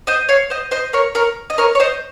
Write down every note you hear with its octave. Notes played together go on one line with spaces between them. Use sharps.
C5 D#5
C#5 F5
C5 D#5
C5 D#5
A#4 C#5
A#4 C#5
D#5
A#4 C#5
C#5
C5 D#5